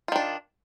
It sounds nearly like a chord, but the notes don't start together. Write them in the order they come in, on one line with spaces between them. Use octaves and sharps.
F4 D#3 D4